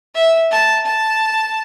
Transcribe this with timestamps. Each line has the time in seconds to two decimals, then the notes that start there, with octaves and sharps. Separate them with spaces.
0.15 E5
0.51 A5
0.86 A5